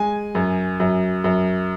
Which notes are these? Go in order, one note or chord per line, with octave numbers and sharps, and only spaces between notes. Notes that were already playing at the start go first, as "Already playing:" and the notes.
Already playing: G#3 G#5
F#2
F#2
F#2